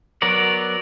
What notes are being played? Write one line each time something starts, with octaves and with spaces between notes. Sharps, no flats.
F#3 B3 A#4 D5